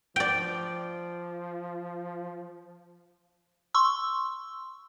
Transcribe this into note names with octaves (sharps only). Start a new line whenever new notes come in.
F3 D5 G5
C6 C#6 E6